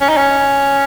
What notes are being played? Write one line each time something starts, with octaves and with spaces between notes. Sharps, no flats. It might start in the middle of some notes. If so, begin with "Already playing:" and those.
C#4
D#4
C#4